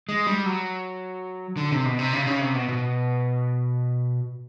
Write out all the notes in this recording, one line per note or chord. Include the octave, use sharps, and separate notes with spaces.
G#3
G3
F#3
D3
C3
B2
C3
C#3
C3
C#3
C3
B2
B2